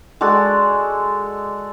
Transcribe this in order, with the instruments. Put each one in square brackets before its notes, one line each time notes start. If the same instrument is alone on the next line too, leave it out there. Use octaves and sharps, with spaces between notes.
[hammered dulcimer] G#3 F#4 A4 D5